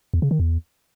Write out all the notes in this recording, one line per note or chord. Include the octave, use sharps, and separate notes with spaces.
E2
C#3
D#3
E2